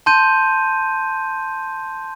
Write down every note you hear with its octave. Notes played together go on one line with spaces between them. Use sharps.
A5 C6 G6 D#7